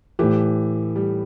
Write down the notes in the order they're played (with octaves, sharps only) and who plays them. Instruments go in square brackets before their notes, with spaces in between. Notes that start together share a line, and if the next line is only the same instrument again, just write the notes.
[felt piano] A2 A3 G4 [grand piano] E3
[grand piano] G3